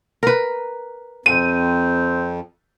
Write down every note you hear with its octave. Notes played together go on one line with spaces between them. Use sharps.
A#4 B4
F2 C4 D#7